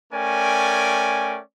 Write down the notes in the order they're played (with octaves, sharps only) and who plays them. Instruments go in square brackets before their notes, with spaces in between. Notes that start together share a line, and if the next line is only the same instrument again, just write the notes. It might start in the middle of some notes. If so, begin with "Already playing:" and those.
[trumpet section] A3 C#4 A#4 D5 G5 G#5